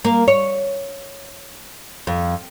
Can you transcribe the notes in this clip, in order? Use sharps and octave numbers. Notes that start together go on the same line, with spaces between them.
A#3
C#5
F2